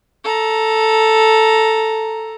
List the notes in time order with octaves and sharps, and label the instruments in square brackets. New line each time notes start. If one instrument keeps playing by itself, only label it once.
[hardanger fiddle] A4 A#5